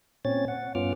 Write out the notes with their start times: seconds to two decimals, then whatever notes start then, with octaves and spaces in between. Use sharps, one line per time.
0.25 A#2 C4 C#4 C#5 A6
0.48 F#5
0.75 G2 B3 C#4 F4 D6 F6